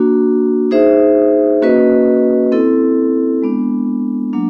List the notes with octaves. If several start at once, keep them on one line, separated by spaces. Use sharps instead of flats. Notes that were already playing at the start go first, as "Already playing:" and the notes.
Already playing: A#3 D4 F#4
D#4 G#4 C5 E5
A#3 C#4 F#4 B4 D#5
C4 E4 A4
G#3 B3 D4
F#3 A#3 D4